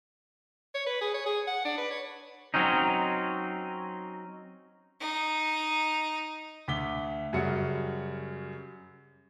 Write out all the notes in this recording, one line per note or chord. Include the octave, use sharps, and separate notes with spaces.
C#5
B4
G#4
C#5
G#4
F#5
D4
B4
C#5
F#3 C4 C#4 D#4
D#4
D2 D6 B6 G7
F#2 C#3 G3 F#4 C#7